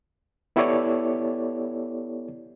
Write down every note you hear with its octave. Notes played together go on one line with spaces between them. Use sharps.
B3 E4 G4 A4 C#5 D5